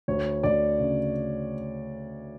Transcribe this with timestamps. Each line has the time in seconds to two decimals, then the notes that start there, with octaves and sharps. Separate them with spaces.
0.08 D2 C#5
0.43 D2 D5
0.79 C#3